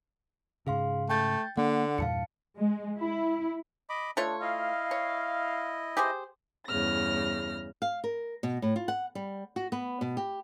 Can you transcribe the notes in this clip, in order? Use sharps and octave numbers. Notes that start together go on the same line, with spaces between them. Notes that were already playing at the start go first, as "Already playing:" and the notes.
G#2 C#3 G#4 F5 C6
A3 G5 G6 A6
D3 A#3 F#5
E2 G2 A#2 F5 A5 C#7
G#3
E4
D#5 B5 D6
A3 D4 F4 C#5
E4 D#5 F5
C#5
G4 G#4 C5
E2 G2 C#3 F6 A#6
F5
A#4
B2
A2
F4
F#5
G3
F#4
B3
B2
G4